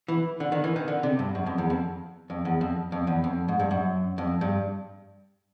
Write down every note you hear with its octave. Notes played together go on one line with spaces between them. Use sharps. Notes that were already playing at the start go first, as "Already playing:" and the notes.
E3
D3
D#3
E3
D#3
D3
C3
G2
F#2
F2
E2
F2
F2
E2
F2
F2
E2
F2
G#2
G2
F#2
F2
G2